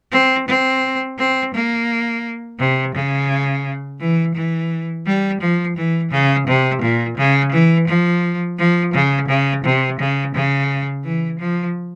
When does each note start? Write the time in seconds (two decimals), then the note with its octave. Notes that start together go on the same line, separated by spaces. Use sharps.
0.12 C4
0.48 C4
1.18 C4
1.54 A#3
2.59 C3
2.95 C#3
4.00 E3
4.35 E3
5.06 G3
5.41 F3
5.76 E3
6.11 C#3
6.47 C3
6.82 A#2
7.17 C#3
7.52 E3
7.87 F3
8.58 F3
8.94 C#3
9.28 C#3
9.64 C3
9.99 C#3
10.35 C#3
11.05 E3
11.40 F3